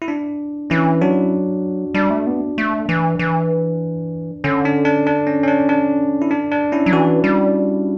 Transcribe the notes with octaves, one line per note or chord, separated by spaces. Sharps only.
E4
D4
E3 C#4 E4
F#3 D4 F#4
G3 D4
A3
B3
A3
E3
E3
D3 C#4
D4
D4
D4
C#4
C#4
D4
D4
E4
D4
D4
C#4 E4
F#3
E3 D4 F#4
G3